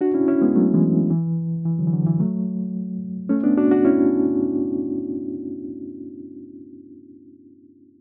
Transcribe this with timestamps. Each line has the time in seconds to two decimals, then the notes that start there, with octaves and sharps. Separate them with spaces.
0.01 D4 F#4
0.14 C#4 E4
0.28 C#4 E4
0.42 G#3 B3
0.55 F#3 A3
0.74 E3 G#3
1.10 E3
1.65 E3
1.79 D3 F#3
1.87 E3
1.93 D3 F#3
2.06 E3
2.20 F#3 A3
3.29 A3 C#4
3.43 B3 D4
3.57 D4 F#4
3.71 D4 F#4
3.85 C#4 E4